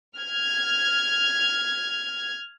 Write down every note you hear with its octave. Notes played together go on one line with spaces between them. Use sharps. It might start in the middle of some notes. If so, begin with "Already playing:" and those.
F6 G#6